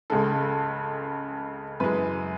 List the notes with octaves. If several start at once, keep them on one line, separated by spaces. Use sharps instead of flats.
C#2 C#3 G#3 A4
F#2 E3 G#3 B4